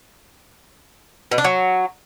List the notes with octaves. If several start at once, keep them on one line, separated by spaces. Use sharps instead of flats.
B2
D4
F#3